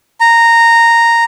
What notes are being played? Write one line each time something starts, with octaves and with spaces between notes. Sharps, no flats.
A#5